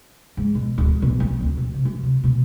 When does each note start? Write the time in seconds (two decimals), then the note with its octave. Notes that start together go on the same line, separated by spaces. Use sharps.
0.37 G#2
0.55 B2
0.78 D1
0.90 G#2
1.02 B1
1.20 C4
1.41 D2
1.57 B2
1.74 C3
1.85 F#2
2.03 C3
2.24 B2